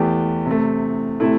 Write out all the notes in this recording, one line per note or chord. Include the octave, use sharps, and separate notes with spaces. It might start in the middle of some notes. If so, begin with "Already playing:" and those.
Already playing: E2 E3 A3 G4
C3
A3
C3 A3 E4